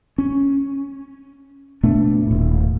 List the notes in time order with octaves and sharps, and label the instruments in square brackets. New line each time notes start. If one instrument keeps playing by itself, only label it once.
[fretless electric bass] C#4
B2 A3 B3 D4
D#1 A2